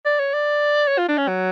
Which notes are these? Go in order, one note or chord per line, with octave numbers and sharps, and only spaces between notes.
D5
C#5
D5
C#5
F4
D4
C#4
F#3